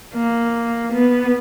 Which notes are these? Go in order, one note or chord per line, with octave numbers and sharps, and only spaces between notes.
A#3
B3